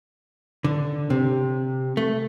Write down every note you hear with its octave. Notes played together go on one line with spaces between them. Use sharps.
D3
C3
A3